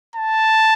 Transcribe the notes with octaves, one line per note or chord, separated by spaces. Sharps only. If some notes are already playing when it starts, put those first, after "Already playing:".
A5